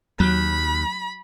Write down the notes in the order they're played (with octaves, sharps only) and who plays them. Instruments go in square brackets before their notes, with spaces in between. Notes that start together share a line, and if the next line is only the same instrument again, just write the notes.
[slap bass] D#2 [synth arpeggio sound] F#3 [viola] B5